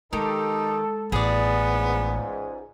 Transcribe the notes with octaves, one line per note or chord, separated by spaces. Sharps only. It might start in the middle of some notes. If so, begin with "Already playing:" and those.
D#3 G#3 D#4 G4 A4
A1 B3 G#4 D5
C#2 G#2